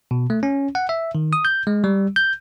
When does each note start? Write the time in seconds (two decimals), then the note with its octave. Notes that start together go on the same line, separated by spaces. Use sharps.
0.11 B2
0.30 A3
0.43 C#4
0.75 F#5
0.89 E5
1.15 D#3
1.33 D#6
1.45 G6
1.67 G#3
1.84 G3
2.16 G6